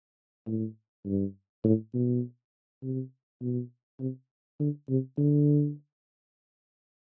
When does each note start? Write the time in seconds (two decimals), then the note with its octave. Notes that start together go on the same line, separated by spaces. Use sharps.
0.47 A2
1.05 G2
1.64 A2
1.94 B2
2.83 C3
3.41 B2
4.00 C3
4.59 D3
4.89 C3
5.18 D3